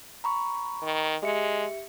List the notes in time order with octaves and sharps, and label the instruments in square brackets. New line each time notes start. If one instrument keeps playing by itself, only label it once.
[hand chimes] A#5 B5 C#6
[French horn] D#3
[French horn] G#3 [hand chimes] G4 E5 C#7